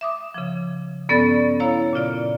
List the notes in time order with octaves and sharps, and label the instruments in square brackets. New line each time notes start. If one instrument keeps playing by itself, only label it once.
[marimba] E5 D6 D#6
C#3 F3
G2 B3 C#4 A4 D5 A6
E4 C#5 F5 A#5
A#2 C#3 F4 D5